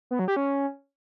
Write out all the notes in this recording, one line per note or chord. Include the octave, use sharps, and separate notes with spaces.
B3
F#3
G4
C#4